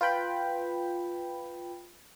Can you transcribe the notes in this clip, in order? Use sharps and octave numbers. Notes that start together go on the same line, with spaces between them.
F4 B4 G5 B5